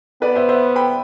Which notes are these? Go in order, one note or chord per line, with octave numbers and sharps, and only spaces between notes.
B3 B4 D5
C5 E5
C5 E5
G5 B5